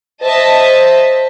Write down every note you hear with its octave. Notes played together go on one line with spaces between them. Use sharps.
C5 D#5 E5 A5